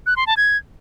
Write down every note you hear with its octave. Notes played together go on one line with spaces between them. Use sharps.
F#6
C6
A5
G#6